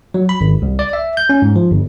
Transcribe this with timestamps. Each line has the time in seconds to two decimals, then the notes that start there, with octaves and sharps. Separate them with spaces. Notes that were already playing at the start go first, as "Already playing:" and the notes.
0.14 F#3
0.29 B5
0.41 G#1
0.62 C2
0.79 D5
0.93 E5
1.17 G6
1.29 C#4
1.42 G#2
1.56 F3
1.71 G1